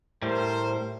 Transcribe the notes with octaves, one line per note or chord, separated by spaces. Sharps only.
A2 G3 A#4 C5